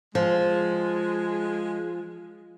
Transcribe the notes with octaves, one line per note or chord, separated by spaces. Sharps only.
F3 G#3